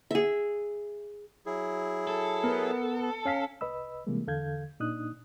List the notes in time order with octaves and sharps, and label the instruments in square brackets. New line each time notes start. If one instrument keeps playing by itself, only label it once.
[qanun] G#4 E5
[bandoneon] F#3 E4 G#4
[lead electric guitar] A4
[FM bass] B3 [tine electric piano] A#4
[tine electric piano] C#4 F5 B6
[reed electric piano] C2 B4 D#5 B5 E6
C3 E3 G3 G#3 A#3
E2 D3 A4 F5 G6 G#6
A#2 D4 D#4 D#6 F#6